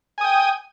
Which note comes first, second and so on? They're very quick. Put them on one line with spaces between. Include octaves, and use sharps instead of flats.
G#5 D#6 G5